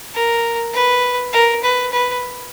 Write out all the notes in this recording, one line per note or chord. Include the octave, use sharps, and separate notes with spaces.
A#4
B4
A#4
B4
B4